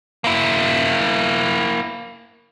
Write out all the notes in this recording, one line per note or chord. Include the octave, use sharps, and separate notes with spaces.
A#3 E4